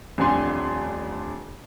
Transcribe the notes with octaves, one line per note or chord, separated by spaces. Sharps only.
D#1 A1 F2 D4 G#5 C6